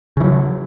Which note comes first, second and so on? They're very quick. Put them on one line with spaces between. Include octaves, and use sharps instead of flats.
C#3 E3 F#3